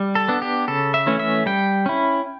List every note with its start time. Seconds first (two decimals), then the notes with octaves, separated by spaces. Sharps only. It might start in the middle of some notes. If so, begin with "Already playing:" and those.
Already playing: G3
0.15 A4
0.28 B3 D4
0.42 G4
0.68 C#3 A4
0.94 E5
1.07 E3 A3 C#4
1.20 E5
1.46 G3 G5
1.86 C#4 E4